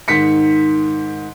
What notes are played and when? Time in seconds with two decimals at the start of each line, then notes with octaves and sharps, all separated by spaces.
0.08 G#2 D#3 B6 C#7